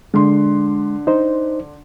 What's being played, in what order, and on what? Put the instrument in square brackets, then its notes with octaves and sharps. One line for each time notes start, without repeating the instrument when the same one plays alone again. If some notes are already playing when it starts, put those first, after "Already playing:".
[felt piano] D3 C6 [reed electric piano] G#3
[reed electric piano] D#4 C5